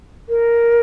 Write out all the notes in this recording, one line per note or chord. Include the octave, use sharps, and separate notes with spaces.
A#4